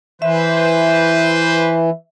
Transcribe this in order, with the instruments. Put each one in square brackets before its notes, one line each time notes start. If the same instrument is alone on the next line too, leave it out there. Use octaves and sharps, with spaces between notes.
[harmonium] E3 [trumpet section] B4 C5 [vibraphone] E5